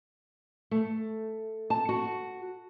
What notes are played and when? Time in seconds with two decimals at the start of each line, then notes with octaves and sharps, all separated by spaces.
0.71 A3
1.70 A5
1.89 F#4